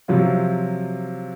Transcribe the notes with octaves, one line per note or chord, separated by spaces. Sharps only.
C3 F3 F#3 F4